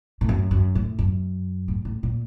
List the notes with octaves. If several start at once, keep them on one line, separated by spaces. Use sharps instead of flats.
A2
F#2
F#2
A2
F#2
A2
A2
A#2